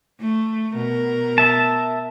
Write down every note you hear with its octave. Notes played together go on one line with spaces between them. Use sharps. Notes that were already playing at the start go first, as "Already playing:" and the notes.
A3
B2 A#4
E5 A5